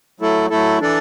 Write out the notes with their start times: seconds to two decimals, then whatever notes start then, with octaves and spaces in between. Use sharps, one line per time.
0.20 F#3 A3 E4 A4
0.50 F#3 A3 E4 A4
0.80 E3 D4 A4 D5